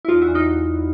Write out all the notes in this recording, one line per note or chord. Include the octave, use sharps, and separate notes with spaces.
E4
E2 D#4 F4
E4 F#4
E2
D#4 F4